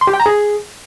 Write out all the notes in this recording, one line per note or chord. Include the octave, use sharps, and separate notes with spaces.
C6
G4
G5
A#5
G#4